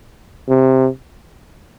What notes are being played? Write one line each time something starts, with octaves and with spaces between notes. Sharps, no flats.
C3